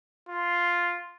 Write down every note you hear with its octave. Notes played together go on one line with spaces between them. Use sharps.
F4